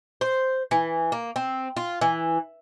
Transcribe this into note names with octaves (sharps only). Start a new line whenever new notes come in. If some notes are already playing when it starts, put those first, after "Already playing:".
C5
E3
A#3
C4
F4
E3